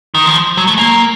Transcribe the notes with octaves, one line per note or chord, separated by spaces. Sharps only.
D#3
F3
F#3
A3
A#3